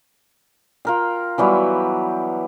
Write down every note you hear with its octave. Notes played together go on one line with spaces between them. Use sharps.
F4 A#4 G5
E3 F#3 G3 B3